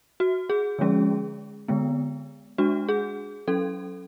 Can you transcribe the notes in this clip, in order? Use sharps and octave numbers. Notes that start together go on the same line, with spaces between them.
F#4
G#4
D3 F3 G#3 C#4
D3 G#3 B3
G#3 D4 F#4
G#4
F#3 C#4 A4